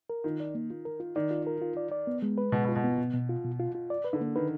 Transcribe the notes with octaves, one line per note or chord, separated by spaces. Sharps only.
A#4
D#3 F4
D5
A#3
F4
A#4
F4
D#3 D5
F4
A#4
F4
D5
D5
B3
G#3
B4
B2 G#3
B2
F4
B2
B3
B2
B2
F4
B2
F4
F4
D5
B4
D3
A#3
D#3 B4